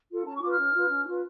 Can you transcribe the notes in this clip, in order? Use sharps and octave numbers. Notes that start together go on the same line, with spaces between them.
F4 A4
C#4 A5
C#6
F4 B4 D6 F6
C#4
F4 B4
C#4
F4 B4